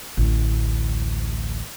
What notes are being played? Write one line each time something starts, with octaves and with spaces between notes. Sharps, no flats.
A1 D2